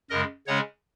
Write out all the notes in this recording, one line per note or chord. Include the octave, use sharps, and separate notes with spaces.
F#2 C#3 G#3 A#4 D#5
C#3 G#3 C#4 C#5 F#5